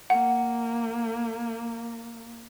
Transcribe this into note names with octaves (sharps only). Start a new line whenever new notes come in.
A#3 F#5